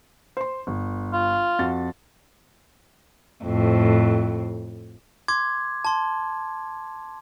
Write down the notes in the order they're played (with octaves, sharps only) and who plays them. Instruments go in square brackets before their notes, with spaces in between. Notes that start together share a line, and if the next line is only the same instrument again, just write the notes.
[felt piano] C5 C6
G1
[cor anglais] F4
[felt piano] F2 F#4 A6
[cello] F2 A2
[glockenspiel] C6 D6 G#6
A5 C6